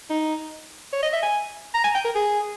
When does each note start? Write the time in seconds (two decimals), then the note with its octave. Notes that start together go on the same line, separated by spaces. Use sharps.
0.10 D#4
0.93 C#5
1.03 D#5
1.13 E5
1.23 G#5
1.74 A#5
1.84 G#5
1.95 G5
2.05 A#4
2.15 G#4